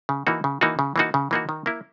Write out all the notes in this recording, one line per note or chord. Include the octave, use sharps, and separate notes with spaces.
C#3
E3 A#3 D#4 F#4
C#3
E3 A#3 D#4 F#4
C#3
E3 A#3 D#4 F#4
C#3
E3 A#3 D#4 F#4
D#3
A#3 E4